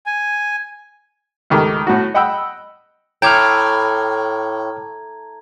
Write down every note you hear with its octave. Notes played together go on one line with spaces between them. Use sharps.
G#5
C#2 D#3 A3 G4
A2 F#4
D#5 F#5 G5 B5 E6
A2 G5 A#5 D6 F6 G#6